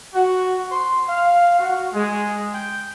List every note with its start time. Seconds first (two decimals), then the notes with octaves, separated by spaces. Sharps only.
0.14 F#4
0.71 C6
1.09 F5
1.59 F#4
1.94 G#3
2.53 G5